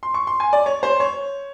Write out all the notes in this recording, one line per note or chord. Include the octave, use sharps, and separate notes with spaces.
C6
C#6
C6
G#5
D5
C#5
C5
C#5